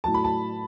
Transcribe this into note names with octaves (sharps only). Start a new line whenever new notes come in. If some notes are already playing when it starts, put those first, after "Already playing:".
A2 F#3 A5
B5
A5